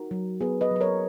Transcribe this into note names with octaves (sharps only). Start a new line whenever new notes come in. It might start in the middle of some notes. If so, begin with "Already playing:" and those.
Already playing: D#4 F#4 A#4
F#3
B3 G#4 B4
B4 D#5
F#3 B4
A#4 C#5